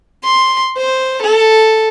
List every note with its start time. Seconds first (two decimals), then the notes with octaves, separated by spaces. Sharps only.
0.24 C6
0.78 C5
1.23 A4